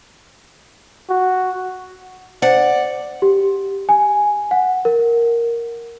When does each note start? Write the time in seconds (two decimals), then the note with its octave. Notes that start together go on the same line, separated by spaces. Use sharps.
1.10 F#4
2.42 C5 D5 F#5
3.22 G4
3.89 G#5
4.51 F#5
4.85 A#4